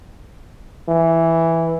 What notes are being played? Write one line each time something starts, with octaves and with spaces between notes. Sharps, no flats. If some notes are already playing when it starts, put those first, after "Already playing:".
E3